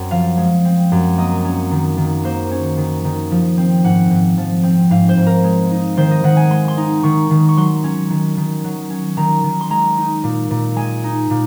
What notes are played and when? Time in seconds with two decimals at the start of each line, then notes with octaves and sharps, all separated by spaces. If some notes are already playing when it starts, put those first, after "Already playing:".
Already playing: F#2 C4
0.11 F3 F5
0.37 G#3
0.65 C4
0.92 F#2
1.18 A#3 D#5
1.45 C#4
1.71 D#3
1.97 D#3
2.24 A#3 C5
2.51 C#4
2.78 D#3
3.04 D#3
3.31 F3
3.58 C4
3.84 G#2 F#5
4.11 G#2
4.38 F3
4.63 C4
4.90 G#2 F5
5.09 C5
5.17 G#2
5.26 A#4
5.44 G#3
5.71 D#4
5.97 D#3 C5
6.11 D#5
6.24 D#3 F#5
6.37 G#5
6.50 G#3 C6
6.68 C6
6.77 D#4
7.03 D#3 C#6
7.30 D#3
7.49 C#6
7.57 F#3 C6
7.84 C#4
8.10 D#3
8.37 D#3
8.64 F#3
8.90 C#4
9.17 D#3 A#5
9.44 D#3
9.61 C6
9.70 G#3 A#5
9.97 D#4
10.24 A#2
10.51 A#2
10.76 G#3 G#5
11.04 D#4
11.30 A#2